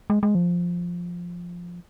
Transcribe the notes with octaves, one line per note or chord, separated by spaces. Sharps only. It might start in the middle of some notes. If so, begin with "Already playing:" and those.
G#3
G#3
F3